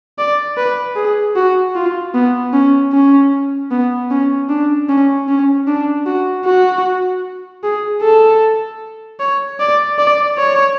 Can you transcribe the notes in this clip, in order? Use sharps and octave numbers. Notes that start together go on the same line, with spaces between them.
D5
B4
G#4
F#4
F4
B3
C#4
C#4
B3
C#4
D4
C#4
C#4
D4
F#4
F#4
G#4
A4
C#5
D5
D5
C#5